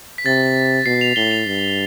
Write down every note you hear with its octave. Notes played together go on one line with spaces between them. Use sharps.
B6
C3 A6
B2 C7
F7
A2 G7
F7
G2